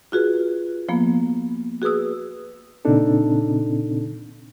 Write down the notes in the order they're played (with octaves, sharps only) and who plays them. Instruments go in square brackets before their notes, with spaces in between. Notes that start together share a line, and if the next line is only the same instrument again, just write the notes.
[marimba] F4 F#4 G#4 B4
F3 A#3 B3
F#4 G#4 B4 D#6 E6
[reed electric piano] A#2 C#3 C4 D4 D#4 A4